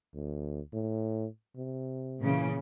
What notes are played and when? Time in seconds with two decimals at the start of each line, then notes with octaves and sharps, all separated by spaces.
0.14 D2
0.73 A2
1.56 C3
2.21 A#2 C#3 E3